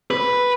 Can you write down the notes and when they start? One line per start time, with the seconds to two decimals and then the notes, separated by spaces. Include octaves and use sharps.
0.11 B4